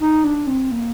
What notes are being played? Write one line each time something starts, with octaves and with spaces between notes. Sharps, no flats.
D#4
D4
C4
A#3